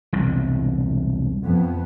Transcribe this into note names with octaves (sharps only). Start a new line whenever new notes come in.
E1 C2
F2 B3